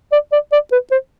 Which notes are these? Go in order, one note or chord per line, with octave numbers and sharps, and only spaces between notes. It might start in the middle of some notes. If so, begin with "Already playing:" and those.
D5
D5
D5
B4
C5